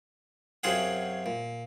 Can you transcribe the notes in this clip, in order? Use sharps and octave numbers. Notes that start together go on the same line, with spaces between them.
F#2 C3 F#3 F4 G#4 F#5
A#2